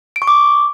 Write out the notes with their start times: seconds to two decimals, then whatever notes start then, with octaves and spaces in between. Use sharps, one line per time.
0.16 D7
0.22 C#6
0.27 D6